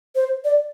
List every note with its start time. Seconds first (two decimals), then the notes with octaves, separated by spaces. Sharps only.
0.15 C5
0.44 D5